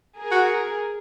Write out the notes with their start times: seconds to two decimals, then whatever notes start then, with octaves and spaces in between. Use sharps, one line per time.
0.18 G#4 A#4
0.31 F#4